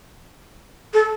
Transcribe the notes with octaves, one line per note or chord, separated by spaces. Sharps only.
A4